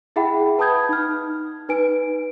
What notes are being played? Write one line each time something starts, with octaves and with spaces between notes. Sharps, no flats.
E4 G#4 E5 F#5 G5 B5
B4 A5 B5 D#6 G6 G#6
D#4 F6
D#4 B4 G#5 D7